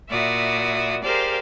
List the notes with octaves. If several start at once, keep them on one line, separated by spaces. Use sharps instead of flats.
A#2 E4 F#4 D5 E5 D#6
G4 G#4 A#4 C5 D5 F5